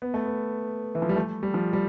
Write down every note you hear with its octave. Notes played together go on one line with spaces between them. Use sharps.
B3
A3
B3
E3
F3
G3
A3
G3
F3
G3